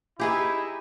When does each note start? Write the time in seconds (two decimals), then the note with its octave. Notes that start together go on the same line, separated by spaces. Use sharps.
0.20 D#4 E4 G4 G#4 B4